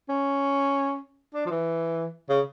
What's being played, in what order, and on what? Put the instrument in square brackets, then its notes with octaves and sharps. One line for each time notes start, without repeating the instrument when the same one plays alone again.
[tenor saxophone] C#4
D4
F3
E3
C#3